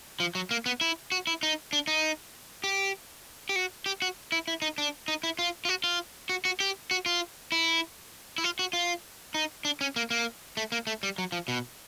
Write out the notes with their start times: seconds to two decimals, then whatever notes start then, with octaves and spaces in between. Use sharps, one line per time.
0.20 F3
0.35 F#3
0.51 A#3
0.66 B3
0.81 E4
1.12 F#4
1.27 E4
1.43 D#4
1.73 D4
1.87 D#4
2.64 G4
3.49 G4
3.56 F#4
3.86 G4
4.02 F#4
4.32 E4
4.48 E4
4.62 D#4
4.78 D4
5.08 D#4
5.23 E4
5.39 F4
5.65 F4
5.69 F#4
5.84 F4
6.29 F#4
6.45 F#4
6.60 G4
6.91 F#4
7.06 F4
7.52 E4
8.38 E4
8.44 F4
8.59 F#4
8.73 F4
9.34 D#4
9.65 D4
9.81 C#4
9.96 A#3
10.11 A#3
10.57 A3
10.72 A#3
10.87 A3
11.03 G3
11.18 F#3
11.32 F3
11.48 B2